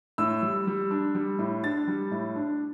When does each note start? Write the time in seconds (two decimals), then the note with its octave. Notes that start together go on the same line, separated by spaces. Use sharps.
0.18 A2 E6
0.42 G3
0.67 G3
0.91 D4
1.15 G3
1.39 A2
1.64 D4 A6
1.88 G3
2.11 A2
2.36 D4